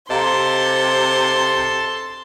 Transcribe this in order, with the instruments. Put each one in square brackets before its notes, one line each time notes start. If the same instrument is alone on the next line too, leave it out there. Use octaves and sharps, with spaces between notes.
[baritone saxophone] C3 [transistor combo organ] A4 [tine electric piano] D#5 F5 A#5 [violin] C6